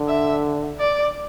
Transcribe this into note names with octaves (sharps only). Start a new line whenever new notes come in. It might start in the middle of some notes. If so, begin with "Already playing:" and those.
Already playing: D3
E5
D5